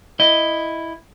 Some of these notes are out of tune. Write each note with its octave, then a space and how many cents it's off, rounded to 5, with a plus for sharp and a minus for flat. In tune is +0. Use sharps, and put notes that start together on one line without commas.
E4 +0 D#5 +0